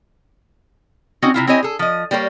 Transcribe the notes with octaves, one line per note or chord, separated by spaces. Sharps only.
C4 C#4 D#4 F#4
C3 E4 F4
C4 E4 G4 C#5 D#5 G#5
G#4 A4
F3 D#5
G3 A#3 G4 C5 C#5